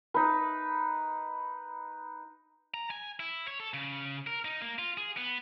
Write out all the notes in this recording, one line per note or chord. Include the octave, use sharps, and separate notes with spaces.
D#4 B4
A#5
G#5
E4
C#5
A4
C#3
A#4
D#4
A#3
F4
G#4
B3